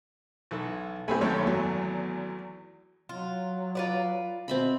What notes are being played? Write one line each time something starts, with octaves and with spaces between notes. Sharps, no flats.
B1 E3 A4
B1 A3 C4 G4 G#5 B5
G#1 F#2 A3 C#5 G5
E2 F#3
F#3 F4
F4 B4 D5
B2 C4 E5 B5